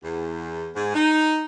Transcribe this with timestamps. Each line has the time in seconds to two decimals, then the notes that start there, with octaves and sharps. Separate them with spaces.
0.01 E2
0.74 G#2
0.94 D#4